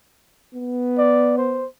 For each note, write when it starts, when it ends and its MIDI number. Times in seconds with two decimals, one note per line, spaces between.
0.55 1.66 59
0.98 1.34 74
1.37 1.66 72